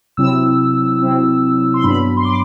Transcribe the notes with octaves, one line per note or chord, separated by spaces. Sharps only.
C3 F#3 C4 E4 E6
C3 F#3 C4 E4
C6
G2 F#3 B3 D4 B5
C6
D6